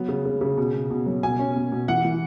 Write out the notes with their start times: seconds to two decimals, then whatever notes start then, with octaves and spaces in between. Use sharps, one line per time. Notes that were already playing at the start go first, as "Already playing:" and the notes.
Already playing: F#3 B3
0.08 C#3
0.25 C#3
0.41 C#3
0.57 B2
0.74 B2
0.90 B2
1.06 F#3
1.23 B2 G#5
1.39 C#4
1.55 B2
1.72 B2
1.88 E3 F#5
2.05 E3